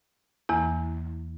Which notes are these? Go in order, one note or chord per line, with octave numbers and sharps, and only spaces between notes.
E2 E3 A#3 E4